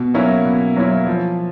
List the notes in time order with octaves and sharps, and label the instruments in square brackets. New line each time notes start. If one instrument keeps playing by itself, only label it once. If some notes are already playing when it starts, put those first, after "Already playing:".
Already playing: [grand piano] B2
F#3 A#3 C#4 E4
B2
F#3 A#3 C#4 E4
F3